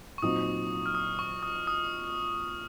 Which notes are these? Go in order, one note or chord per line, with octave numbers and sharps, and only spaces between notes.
C#6
A#2 F#3 C4 D#4 D#6
F6
D#6
C#6
D#6
D#6